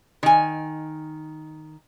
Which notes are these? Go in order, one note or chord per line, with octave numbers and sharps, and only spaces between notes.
D#3 G#5